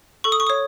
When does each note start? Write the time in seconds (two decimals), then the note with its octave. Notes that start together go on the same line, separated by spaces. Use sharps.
0.24 A4 C#6
0.32 D#6
0.40 C#6
0.47 D#6
0.50 C#5